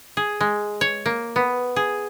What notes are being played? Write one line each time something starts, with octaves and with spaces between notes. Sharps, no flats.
G#4
G#3
C#5
A#3
B3
G#4